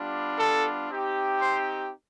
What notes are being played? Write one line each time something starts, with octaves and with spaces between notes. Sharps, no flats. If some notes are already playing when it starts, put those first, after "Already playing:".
Already playing: G3 B3 D4 F4
A4
C4 D#4 G4
C5